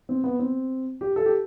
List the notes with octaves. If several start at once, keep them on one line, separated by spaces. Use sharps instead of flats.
C4
B3
C4
G4
A4
G4